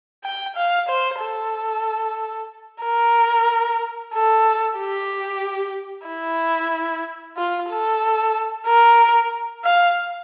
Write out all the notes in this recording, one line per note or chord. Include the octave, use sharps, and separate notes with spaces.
G5
F5
C5
A4
A#4
A4
G4
E4
F4
A4
A#4
F5